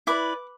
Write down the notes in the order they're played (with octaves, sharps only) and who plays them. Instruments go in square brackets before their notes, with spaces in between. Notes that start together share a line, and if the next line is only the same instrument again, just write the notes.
[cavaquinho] E4 B4 D5 D6